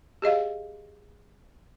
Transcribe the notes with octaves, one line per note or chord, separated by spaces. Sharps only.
G4 G#4 D#5 F5